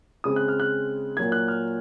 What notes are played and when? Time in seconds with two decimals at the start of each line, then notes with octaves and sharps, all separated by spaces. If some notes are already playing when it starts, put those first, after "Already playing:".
0.24 C#3 G#3 C4 D#6
0.36 F#6
0.48 F6
0.60 F#6
1.17 A#2 F#3 A#3 G#6
1.32 F#6
1.48 F6